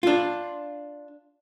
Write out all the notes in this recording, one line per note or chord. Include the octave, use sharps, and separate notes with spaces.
D4 F4